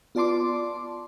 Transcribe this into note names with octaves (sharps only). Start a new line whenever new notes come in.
B3 F4 D5 A5 C6 D6